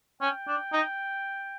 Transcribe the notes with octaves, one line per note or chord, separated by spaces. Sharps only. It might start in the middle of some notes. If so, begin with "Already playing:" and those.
C#4 G5
D4
D#4